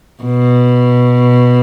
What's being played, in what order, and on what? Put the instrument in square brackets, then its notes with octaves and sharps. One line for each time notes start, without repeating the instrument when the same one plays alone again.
[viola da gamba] B2